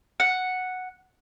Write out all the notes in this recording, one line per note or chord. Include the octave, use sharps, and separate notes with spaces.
F#5